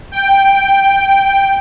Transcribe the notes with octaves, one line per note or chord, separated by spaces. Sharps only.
G5 D7